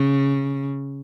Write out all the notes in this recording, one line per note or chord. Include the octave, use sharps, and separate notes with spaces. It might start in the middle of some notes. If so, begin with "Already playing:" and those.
Already playing: C#3